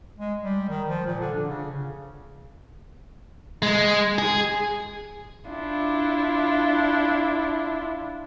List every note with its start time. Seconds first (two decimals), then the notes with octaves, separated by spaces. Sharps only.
0.19 G#3
0.42 G3
0.69 D#3
0.88 F3
1.06 A#2
1.20 D3
1.34 D4
1.48 C#3
3.62 G#3
4.18 G#4
5.50 D4 E4 F4